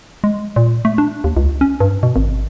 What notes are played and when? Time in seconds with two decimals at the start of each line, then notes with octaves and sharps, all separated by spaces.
0.24 G#3
0.56 A#2
0.85 A3
0.98 D4
1.24 D#2
1.37 C#2
1.61 C#4
1.80 G2
2.03 B2
2.16 G#1